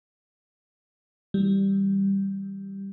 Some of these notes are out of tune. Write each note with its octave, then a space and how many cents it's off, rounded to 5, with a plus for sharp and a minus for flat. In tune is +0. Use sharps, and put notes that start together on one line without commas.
E3 -30 G3 +0